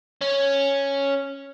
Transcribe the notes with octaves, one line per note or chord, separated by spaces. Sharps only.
C#4